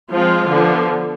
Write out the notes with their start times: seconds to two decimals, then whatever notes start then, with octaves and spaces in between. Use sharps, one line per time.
0.12 F3 G#3 C4 F4
0.49 D3 F3 B3